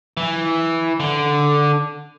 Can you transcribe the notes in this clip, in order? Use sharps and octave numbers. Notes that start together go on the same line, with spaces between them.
E3
D3